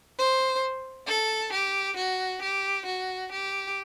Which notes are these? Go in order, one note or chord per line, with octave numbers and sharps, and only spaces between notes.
C5
A4
G4
F#4
G4
F#4
G4